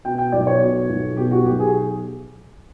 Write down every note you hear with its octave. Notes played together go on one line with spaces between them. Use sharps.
B2 G5
G5
B1 D5
C#5
B2
B1
B2 G4
F#4
B1 G4
G#4